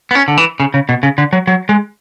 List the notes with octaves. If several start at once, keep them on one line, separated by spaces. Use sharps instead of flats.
B3
C#4
D3
E3
C#3
C#3
B2
C#3
D3
F#3
F#3
G#3